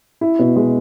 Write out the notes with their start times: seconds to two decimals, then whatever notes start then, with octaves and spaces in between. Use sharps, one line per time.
0.21 E4
0.39 B2
0.56 G#3